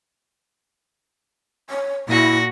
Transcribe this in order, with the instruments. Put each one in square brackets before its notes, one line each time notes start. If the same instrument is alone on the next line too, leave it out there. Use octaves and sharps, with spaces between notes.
[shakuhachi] C#5
[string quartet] A#2 F#4 A#6 [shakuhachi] E4